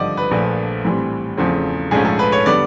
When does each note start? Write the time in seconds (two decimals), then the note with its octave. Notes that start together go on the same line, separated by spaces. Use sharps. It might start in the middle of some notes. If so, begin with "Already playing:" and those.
Already playing: G#1 G2 D3 F3 D5 D#5
0.17 B4
0.31 A#1 A#2 F3 A3
0.85 A2 E3 G3 C4
1.37 E2 C#3 F3 A3 C4
1.91 A#1 G#2 F3 A3 C#4 G#4
2.05 A4
2.19 B4
2.32 C#5
2.46 D3 G3 B3 D5